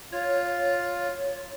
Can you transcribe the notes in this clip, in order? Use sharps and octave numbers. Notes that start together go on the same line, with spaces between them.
F4 C#5